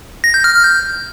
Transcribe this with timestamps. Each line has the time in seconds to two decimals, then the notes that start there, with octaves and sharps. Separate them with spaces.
0.24 A#6
0.34 G6
0.44 F6
0.54 F6
0.65 G6